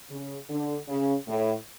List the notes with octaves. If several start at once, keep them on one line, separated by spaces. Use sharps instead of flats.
C#3
D3
C#3
A2